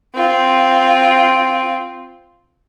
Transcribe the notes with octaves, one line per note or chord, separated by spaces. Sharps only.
C4 F4